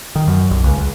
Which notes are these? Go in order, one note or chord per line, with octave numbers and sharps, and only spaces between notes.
D#3
F#2
B1
C#2
C#2